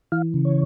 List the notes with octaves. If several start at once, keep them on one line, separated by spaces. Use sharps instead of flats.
E3 F5
C#3
C#5